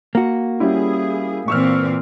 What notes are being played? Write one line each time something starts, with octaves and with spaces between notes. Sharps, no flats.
A#3 F#4
G3 C#4 E4 G#4
A#2 E3 C4 C#6 E6 F6